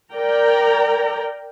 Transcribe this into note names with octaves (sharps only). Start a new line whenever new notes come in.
A#4 D5 G5 A#5